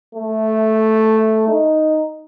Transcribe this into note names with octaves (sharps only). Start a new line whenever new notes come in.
A3
D#4